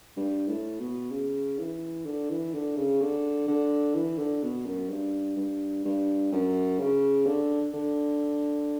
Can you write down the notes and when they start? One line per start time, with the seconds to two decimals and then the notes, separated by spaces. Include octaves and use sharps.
0.17 G2
0.48 A2
0.80 B2
1.11 C#3
1.59 E3
2.05 D3
2.30 E3
2.54 D3
2.76 C#3
3.01 D3
3.48 D3
3.95 E3
4.18 D3
4.43 B2
4.66 F#2
4.90 G2
5.36 G2
5.85 G2
6.32 F#2
6.79 C#3
7.26 D3
7.73 D3